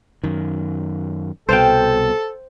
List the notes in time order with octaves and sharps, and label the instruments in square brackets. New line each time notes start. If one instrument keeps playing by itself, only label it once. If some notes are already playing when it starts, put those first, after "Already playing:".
[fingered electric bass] F#2 D#3
[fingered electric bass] C2 B2 [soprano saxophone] A4 [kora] C5 F5 G5